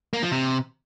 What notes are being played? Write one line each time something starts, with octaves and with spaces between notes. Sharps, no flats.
A#3
F3
C3